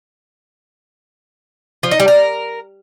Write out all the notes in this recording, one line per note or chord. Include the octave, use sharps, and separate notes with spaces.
F3
D#4
G3
A#4